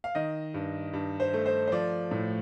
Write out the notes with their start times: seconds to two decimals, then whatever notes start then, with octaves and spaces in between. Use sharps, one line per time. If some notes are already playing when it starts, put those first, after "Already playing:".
0.04 F5
0.15 D#3 D#5
0.54 G2
0.94 G2
1.20 C5
1.33 A3
1.46 C5
1.68 C5
1.72 F3 D5
2.11 A2